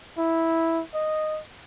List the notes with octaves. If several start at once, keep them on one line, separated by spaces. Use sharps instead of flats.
E4
D#5